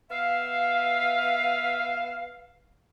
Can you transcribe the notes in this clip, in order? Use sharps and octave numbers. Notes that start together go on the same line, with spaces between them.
B3 E5 F5